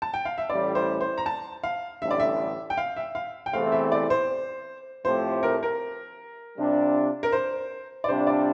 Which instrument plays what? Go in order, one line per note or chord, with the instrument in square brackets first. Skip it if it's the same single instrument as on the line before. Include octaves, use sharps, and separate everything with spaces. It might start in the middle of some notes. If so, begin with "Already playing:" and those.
[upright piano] A5
G5
F5
E5
[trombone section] A1 A2 G3 [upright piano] D5
[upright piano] C5
C5
A#5
A5
F5
[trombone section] A1 G2 D3 [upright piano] E5
[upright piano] D5
E5
G5
F5
E5
F5
G5
[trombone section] E2 C3 E3 A3 C4 [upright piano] F5
[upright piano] E5
D5
C5
[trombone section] A2 F3 A3 C4 G4 [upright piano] C5
[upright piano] A#4
A#4
[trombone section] C3 G3 D4 F4
[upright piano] A#4
C5
D5
[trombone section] C3 G3 D4 F4 [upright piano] C5
[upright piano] D5